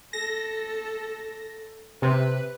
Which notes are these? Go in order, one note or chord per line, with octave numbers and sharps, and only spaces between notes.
A4 A#6
C3 B4